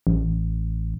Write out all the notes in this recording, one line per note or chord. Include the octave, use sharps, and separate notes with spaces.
A1